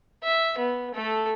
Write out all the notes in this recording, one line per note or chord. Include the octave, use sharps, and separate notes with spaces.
E5
B3
A3 A4